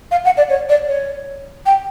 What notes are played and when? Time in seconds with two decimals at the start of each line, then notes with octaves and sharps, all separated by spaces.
0.11 F5
0.25 F#5
0.37 D5
0.49 C#5
0.69 D5
0.88 C#5
1.66 G5